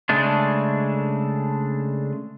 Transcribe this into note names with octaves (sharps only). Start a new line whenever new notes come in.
C#3 G#3 A3 D4